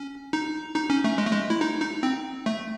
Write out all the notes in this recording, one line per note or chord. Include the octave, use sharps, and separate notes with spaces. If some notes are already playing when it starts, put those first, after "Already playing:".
Already playing: C#4
D#4
D#4
C#4
A3
G#3
A3
G#3
E4
D#4
D#4
C4
A3